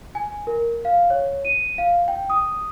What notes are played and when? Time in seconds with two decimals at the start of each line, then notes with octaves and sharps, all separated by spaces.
0.15 G#5
0.47 A#4
0.85 F5
1.10 C#5
1.45 D#7
1.78 F5
2.08 G5
2.30 D#6